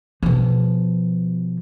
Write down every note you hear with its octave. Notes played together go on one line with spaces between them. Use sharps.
B2 F3